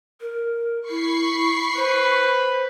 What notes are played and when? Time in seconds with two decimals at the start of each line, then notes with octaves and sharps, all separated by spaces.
0.21 A#4
0.90 E4 B5 C#6 C7
1.76 B4 C5